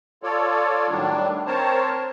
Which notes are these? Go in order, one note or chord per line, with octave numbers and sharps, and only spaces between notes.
F4 A4 C#5 D5
A2 D#3 F#3 G3 D4
C4 A#4 C5 C#5 A5